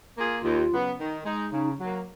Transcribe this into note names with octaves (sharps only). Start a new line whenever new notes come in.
A#3 F4 G#4
D#2 F4
C#3 F#3 B3
D#3
G#3 D#4
C#3 D#4
F#3 A#3